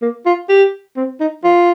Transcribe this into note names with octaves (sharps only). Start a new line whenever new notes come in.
A#3
F4
G4
C4
D#4
F4